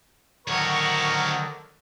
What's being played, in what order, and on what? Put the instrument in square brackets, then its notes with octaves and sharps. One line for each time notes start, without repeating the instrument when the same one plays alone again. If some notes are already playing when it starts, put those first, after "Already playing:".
[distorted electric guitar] D2 C#5 [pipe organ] D3 D#3 F#3 [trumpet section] A#4 C#6